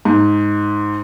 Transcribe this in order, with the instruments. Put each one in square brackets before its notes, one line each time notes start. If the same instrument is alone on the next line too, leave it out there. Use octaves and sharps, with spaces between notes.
[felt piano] G#2